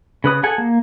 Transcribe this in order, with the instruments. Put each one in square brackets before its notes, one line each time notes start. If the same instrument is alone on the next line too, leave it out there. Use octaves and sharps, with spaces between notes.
[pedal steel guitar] C#3 B4 D#6
G#4 A4 F#5 G#5
A#3